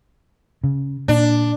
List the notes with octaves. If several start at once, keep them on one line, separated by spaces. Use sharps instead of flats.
C#3
A#2 D4